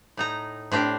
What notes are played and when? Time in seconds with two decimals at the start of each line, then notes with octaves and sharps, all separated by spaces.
0.17 A2 D#4 A#5
0.71 A2 C4 D4 G4